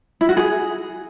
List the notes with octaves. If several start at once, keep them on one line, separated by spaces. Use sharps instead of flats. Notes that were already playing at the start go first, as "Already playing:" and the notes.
E4
F#4
G#4